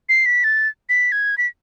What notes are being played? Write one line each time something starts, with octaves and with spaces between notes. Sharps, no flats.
C7
B6
A6
B6
G#6
B6